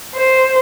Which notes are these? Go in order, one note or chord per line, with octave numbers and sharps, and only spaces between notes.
C5